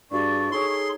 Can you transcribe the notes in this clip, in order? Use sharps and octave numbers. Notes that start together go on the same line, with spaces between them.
G2 D4 F#4 G#4 D5 C#6
D#4 G#4 A4 C#5 C6